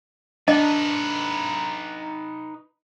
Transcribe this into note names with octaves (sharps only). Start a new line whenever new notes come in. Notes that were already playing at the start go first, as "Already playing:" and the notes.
D4 D#4 B4 D#5